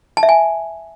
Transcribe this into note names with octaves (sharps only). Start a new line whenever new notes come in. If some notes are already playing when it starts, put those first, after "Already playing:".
A5
E5
G#5